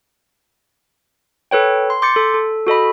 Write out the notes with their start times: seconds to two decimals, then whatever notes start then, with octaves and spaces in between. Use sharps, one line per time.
1.51 A4 B4 C#5 G5
1.90 C6
2.02 C6 D6 G6 A6 C#7
2.16 A4
2.34 A4
2.67 F#4 A4 D#5 B5